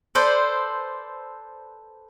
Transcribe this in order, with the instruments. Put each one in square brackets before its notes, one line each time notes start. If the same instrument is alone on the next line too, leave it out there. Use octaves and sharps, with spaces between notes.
[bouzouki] A4 B4 C5 D5